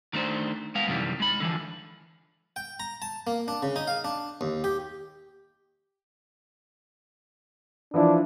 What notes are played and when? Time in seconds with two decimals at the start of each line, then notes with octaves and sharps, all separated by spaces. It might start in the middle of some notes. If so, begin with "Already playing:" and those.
0.13 D#3 A3 D4 C5
0.75 G#3 B3 F5
0.87 F#2 C3 D#3 E3 G3
1.20 G#3 B5
1.40 D3 E3 F3
2.56 G5
2.80 A#5
3.02 A5
3.27 A#3
3.48 D4
3.63 C#3
3.76 D#4
3.87 F5
4.04 D4
4.41 D#2
4.64 G4
7.94 E3 F3 D4 E4